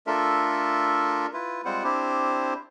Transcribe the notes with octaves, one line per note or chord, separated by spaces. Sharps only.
A3 D4 F4 A4 A#4 E5
E4 F4 B4
G3 G#3 C4 F4 C5 F#5
C4 D4 E4 G4 C5